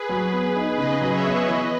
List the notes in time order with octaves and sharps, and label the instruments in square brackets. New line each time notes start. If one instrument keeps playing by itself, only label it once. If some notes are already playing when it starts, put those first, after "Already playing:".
Already playing: [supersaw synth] G#4 B4
[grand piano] F#3
B3
D#4
[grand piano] C#3 [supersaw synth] B4 D#5
[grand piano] F#3
[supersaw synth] C#5 E5
[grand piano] B3
[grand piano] E3 [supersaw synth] B4 D#5